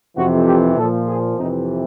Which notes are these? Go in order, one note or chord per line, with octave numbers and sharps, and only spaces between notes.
F2 C3 E3 F#4
G4
A#2 F3 A4
G#4
F2 C3 E3 D#4